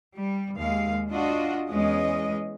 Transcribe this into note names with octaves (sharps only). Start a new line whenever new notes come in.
G3
D#2 G#3 F5
D4 F4 F#4 D#5
E2 G#3 C#4 D#5